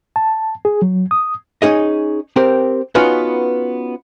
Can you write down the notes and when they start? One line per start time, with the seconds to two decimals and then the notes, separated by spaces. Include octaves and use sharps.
0.16 A5
0.65 G#4
0.82 F#3
1.11 D#6
1.62 C#4 D#4 G#4 D#5
2.36 C4 G4 A#4
2.95 B3 C#4 D#4 F4 F#4 B4